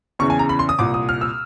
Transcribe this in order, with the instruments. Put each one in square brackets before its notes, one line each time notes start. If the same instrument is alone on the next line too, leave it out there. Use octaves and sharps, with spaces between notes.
[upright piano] E2 C#3 E3 C#6
G#5
A#5
B5
C6
D#6
C2 A#2 D6
D#6
F6
E6